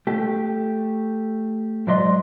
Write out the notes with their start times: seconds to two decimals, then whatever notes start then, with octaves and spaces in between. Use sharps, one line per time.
0.07 A3 G4
1.87 G#2 F#3 D5 D#5 C6